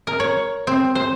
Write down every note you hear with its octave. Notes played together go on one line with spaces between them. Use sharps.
A#4
C#5
C4
C5